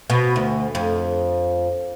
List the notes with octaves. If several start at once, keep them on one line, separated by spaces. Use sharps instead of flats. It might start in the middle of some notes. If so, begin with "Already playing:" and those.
B2
D2
F2